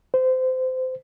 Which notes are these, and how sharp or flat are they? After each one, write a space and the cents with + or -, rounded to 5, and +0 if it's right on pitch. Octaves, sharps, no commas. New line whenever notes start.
C5 -25